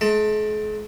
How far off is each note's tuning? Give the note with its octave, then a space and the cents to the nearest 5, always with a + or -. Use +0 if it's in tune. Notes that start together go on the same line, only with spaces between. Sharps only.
G#3 +45 A5 +20